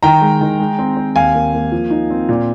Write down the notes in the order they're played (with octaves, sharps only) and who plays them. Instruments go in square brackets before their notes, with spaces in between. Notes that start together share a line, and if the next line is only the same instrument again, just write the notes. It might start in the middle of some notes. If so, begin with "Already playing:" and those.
[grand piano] D#3 G5 A#5
G#3
D#3
G#3
C4
C4
D#2 F5 G#5
A#3
A#3
F3
D#4
C4
A#2